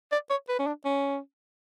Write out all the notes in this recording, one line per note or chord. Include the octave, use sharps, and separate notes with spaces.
D5
C#5
B4
C#4
D4
C#4